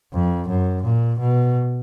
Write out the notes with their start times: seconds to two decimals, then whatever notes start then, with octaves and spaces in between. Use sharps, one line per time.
0.13 F2
0.48 F#2
0.84 A#2
1.19 B2